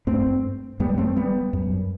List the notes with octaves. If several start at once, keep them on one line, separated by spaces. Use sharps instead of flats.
G2 A3 C4
F#2 G3 B3
A3 C4
G3 B3
F#2